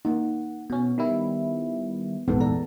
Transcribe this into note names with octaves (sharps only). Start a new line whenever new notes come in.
A#3 D#4 F#5
B2 B3 C#4
D#3 G3 E4
A#1 E2 G#2 B3 A4
A4 D5 A#5